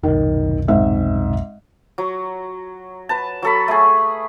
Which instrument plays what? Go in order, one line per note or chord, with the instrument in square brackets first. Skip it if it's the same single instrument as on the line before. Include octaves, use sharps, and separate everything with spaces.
[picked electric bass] F1 B1 [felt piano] D#3
[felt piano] G#2 C4 E5
[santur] F#3
B4 A5
F#3 A4 B5
A3 G#4